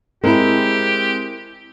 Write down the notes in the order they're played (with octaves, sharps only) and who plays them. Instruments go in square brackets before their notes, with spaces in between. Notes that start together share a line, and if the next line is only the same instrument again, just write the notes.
[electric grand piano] G#3 C4 [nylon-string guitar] E4 A#4 [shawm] G4